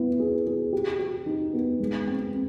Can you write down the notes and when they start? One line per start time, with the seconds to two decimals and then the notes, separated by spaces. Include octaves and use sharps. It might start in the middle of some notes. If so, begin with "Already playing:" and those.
Already playing: B3 E4
0.20 G#4
0.47 G#4
0.73 G4
0.99 G4
1.26 D#4
1.53 B3
1.80 G#3
2.07 C4
2.33 C4